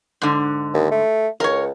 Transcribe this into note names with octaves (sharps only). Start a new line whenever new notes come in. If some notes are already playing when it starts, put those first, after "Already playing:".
G#2 D3
D#2
A3
C#2 A#4 C#5